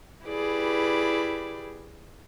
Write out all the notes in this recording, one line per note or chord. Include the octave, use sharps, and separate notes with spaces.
E4 G4 G#4 B4 D5